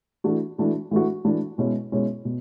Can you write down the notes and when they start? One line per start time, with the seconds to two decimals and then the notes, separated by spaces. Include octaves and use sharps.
0.24 E3 A3 D4 F#4
0.58 E3 A3 D4 F#4
0.91 E3 A3 D4 F#4
1.25 E3 A3 D4 F#4
1.58 B2 G#3 C#4 E4
1.92 B2 G#3 C#4 E4
2.25 B2